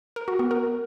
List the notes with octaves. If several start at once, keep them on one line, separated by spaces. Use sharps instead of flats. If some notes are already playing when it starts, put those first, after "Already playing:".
A#4
F#4
B3
A#4